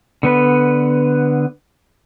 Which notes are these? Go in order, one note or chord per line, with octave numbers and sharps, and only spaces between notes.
D3 B3 B4